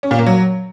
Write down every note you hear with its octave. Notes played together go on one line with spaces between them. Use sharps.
C#4
A#2
A#3
F#3